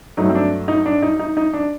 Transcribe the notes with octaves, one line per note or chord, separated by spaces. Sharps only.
G2 F#3 A3 D#4
C4
D4
D#4
D4
D#4
D#4
D#4
D4